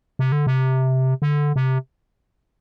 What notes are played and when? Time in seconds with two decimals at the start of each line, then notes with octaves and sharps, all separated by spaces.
0.19 C3
0.32 D3
0.47 C3
1.22 D3
1.56 C3